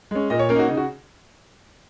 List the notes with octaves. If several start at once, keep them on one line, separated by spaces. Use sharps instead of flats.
G#3 C#4
A#2 D#5
C#5
A#3 C#4 A#4
D#4
F#4
C#3 D#4
F#4